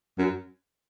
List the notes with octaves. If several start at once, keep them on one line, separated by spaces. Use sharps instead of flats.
F#2